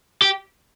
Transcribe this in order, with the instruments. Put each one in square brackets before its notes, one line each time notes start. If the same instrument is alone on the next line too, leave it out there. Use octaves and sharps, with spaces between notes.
[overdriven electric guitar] G4